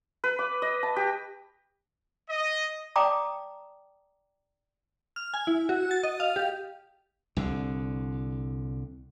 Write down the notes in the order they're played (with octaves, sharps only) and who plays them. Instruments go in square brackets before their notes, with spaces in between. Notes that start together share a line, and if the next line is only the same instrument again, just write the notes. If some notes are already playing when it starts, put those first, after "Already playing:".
[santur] B4
D6
D#5
A5
G4
[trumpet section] D#5
[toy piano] D5 G5 A5 A#5 D6 D#6
[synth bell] F6
G#5
E4
F#4
A6
D#5
F5
G4
[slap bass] C2 D3